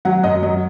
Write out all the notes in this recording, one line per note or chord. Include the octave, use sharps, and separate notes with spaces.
F#3 F#5
F#2 D#5
F#3 D#5